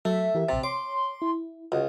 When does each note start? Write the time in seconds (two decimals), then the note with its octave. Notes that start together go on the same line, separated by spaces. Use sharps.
0.05 F#3 A3 E5
0.35 E3 G4 A#4
0.49 A#1 C3 A6
0.63 C#5 C6 D6
1.22 E4
1.72 C#2 F#4 D#5 F5 F#5